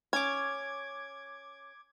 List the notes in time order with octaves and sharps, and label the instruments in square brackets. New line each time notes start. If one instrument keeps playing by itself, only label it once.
[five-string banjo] C#4 [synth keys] D6 G#6